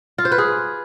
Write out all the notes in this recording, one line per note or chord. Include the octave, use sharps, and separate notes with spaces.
F4
C5
B4
G#4